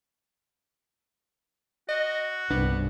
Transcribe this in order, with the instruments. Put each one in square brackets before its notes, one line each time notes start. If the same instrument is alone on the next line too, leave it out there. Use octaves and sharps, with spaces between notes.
[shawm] F#4 [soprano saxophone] D#5
[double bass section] C2 G2 [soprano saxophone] B3 [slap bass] D4